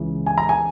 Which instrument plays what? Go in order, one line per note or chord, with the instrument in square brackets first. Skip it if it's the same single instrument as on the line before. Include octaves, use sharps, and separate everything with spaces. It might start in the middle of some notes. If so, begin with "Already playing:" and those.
Already playing: [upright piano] C#2 C#3 E3
G#5
A#5
G#5